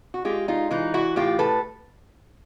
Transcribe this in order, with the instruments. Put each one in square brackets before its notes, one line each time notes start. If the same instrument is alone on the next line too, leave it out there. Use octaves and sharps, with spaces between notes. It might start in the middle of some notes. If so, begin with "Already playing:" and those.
[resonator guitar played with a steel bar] F#4
G#3 F4 G4
D#4 F4
E3 D#4 F4
E4 F#4
A2 F4 G4
A4 B4